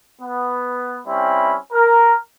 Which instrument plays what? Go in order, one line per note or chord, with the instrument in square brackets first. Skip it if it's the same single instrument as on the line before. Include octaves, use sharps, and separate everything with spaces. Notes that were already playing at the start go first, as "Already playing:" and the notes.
[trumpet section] B3
G3 C4 C#4 E4 B5
A#4